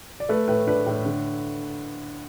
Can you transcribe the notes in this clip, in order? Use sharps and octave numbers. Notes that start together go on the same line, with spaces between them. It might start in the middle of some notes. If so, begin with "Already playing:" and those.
D5
A3 B4
A2 B4
D4 B4
A2
D3